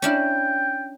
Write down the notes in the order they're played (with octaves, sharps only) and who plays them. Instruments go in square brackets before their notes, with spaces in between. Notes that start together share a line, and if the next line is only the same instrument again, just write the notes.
[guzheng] C#4 D4 E4 [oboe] G5